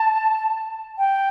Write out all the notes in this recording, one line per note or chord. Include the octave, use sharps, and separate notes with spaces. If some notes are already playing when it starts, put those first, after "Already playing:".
Already playing: A5
G5